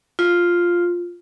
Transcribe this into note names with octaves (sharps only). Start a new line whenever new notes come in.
F4